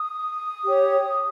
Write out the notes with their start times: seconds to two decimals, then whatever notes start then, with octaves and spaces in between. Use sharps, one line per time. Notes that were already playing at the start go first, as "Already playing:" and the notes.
Already playing: D#6
0.63 G4 C#5